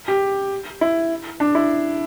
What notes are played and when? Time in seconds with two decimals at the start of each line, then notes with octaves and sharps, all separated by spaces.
0.08 G4
0.81 E4
1.40 D4
1.55 E4